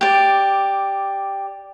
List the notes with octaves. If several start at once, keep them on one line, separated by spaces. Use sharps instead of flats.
G4 D5